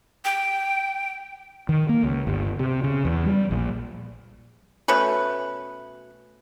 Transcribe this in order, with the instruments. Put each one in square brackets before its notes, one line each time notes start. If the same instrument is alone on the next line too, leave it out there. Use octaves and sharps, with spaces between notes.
[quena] G5
[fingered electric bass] D#3
A#3
C#2
G1
C3
C#3
E2
G3
A#1
[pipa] B2 A3 C#4 B4